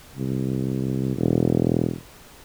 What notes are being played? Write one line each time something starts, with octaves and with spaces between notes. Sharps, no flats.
C2
E1